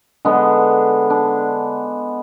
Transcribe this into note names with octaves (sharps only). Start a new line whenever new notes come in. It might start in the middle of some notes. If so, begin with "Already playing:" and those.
D3 G#3 B3 D4
D4